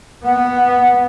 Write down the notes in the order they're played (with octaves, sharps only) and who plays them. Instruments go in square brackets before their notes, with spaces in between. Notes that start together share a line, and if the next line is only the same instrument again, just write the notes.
[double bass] B3 [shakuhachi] F#5